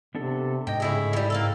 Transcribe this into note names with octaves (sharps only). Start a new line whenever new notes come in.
C3 B3 D4 A4
G#2 D#5 G5
A2 C#3 E4 G#4
E3 G3 E4
A#3 C4 A4